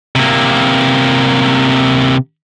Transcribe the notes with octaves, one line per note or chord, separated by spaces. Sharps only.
C3 A#3